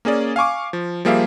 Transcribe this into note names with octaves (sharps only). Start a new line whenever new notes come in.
A#3 C#4 G#4 D5
F5 G#5 C#6 D6
F3
F3 G3 A#3 G#4 E5 F5